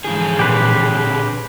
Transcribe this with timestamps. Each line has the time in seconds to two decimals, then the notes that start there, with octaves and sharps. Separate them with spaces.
0.04 G#2 D3 E3 F3 G#4
0.39 A#2 G4 B4 C5